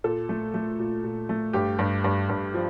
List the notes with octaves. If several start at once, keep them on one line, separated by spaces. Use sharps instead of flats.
A#2 A4
A3
A3
A#2
A#2
A3
G2 G4
G2
G2
G2
F3